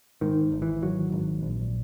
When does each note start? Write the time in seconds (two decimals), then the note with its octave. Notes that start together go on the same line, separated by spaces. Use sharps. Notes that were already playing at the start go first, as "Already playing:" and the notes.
0.21 G#2 D#3
0.52 G#1
0.62 E3
0.82 G#1 F#3
1.12 G#1
1.43 A#1